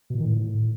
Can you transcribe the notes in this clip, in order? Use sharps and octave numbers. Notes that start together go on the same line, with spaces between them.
B2
A#2
D#3
A2